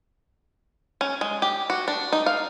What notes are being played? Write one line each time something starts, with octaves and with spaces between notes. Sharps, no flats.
C#4
G#3
G4
F#4
D4
D#4
F5